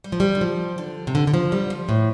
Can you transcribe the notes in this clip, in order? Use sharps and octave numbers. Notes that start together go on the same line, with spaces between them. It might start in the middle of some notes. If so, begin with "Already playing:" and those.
G3
F3
G3
D3
F3
D3
C3
D3
D3
F3
G3
F3
A2